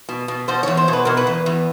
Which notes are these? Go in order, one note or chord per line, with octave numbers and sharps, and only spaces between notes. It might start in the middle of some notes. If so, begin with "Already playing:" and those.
B2
B2
B2 C5
E2 C#5
C5
B2
B4
B2 A#4
B4
E2
E2